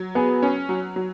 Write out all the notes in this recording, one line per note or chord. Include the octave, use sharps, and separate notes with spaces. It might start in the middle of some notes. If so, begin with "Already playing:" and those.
Already playing: F#3
B3 G#4
C#4
F#3
F#3